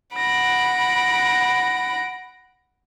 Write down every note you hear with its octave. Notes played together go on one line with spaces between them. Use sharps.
F#5 B5 A#6 D7